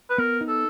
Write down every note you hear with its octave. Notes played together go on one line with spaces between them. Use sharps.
B4
B3 A#4
D#4
A4